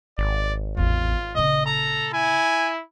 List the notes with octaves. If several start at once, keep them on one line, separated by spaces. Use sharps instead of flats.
G#1 D5
A1 E2 F4
A#2 C#3 D#5
A4 A#5
E4 G#5